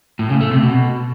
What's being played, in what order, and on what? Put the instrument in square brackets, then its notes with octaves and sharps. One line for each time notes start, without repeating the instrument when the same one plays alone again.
[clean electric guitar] A2
C#3
A3
C3
B2